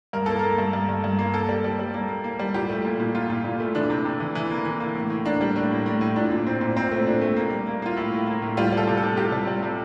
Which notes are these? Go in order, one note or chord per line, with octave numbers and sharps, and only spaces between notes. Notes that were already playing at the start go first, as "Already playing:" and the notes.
G2 A#4
A#3 A4
A#3 A#4
G2
G2
G2
G2
A#3
A#3 A4
G3
G3
G3
A#3
A#3
A#3
G3
A#2 G4
A3
A#2
A#2
A#2 F4
A#2
A#2
A3
E3 D4
C3
C3
E3
E3
A#3
E3
A#3
A2
A2
A#3 D4
G3
A2 D4
A#3
A2
A2
A#2 D4
A#2
C4
A#2
A#2 C4
A3
A#2 D4
A3
A#3
G3
A#3
A#3 F4
A2 E4
A2
A#3
A2
G3 F4
G3 A4
C3
A4
C3
C3 G4
G3
G3
C3